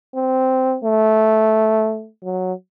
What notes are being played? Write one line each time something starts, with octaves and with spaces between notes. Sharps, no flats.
C4
A3
F#3